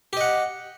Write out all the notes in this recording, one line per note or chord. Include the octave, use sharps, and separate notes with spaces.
G4 D#5 F#5